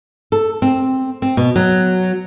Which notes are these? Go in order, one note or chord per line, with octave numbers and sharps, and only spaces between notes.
A4
C4
C4
B2
F#3